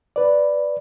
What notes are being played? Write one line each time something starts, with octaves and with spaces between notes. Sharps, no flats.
B4 D5